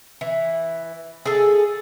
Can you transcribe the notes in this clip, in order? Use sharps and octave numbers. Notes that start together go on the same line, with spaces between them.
E3
G#4 A4